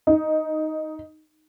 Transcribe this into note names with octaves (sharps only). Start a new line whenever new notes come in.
D#4